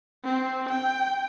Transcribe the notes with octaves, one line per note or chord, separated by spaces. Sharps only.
C4
G5